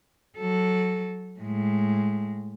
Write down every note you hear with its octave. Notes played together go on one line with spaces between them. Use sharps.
F#3 A4
A2 G#3